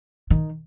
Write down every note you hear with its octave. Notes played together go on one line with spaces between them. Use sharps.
D#3